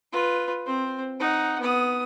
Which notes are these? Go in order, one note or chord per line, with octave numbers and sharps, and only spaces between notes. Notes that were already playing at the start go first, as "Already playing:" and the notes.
F4 B4
C4 C5
D#4 F#5
B3 D#6